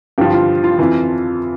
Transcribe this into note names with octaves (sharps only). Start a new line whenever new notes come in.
G2 F3 G4
F4
F4
F2 E3